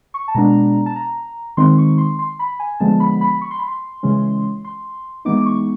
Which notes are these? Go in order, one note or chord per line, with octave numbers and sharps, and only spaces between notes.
C#6
A5
B2 G#3 B3 D4 A#5
A5
A#5
D#3 G#3 C4 D#4 C6
C#6
C6
C6
B5
G#5
D3 F3 G#3 B3 A5
B5
B5
C#6
C6
B5
C6
C#3 E3 G#3 C#4
C6
E3 G#3 B3 D#4 D6
D6
C#6